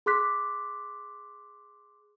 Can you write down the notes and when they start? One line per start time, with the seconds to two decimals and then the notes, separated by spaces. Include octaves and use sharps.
0.06 G#4 C6 D6 F#6 B6